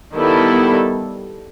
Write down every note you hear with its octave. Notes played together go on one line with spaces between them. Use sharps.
D#3 G3 B3 E4 A4